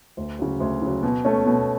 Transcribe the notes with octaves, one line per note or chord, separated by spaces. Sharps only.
D2
C#3 F#3
D2
C#3 F#3
B2
A3 C#4
B2